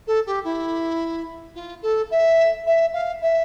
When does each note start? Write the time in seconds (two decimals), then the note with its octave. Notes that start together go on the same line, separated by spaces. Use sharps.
0.07 A4
0.26 G4
0.44 E4
1.55 F4
1.82 A4
2.10 E5
2.66 E5
2.93 F5
3.21 E5